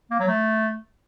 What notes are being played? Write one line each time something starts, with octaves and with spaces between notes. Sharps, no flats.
A#3
F#3
A3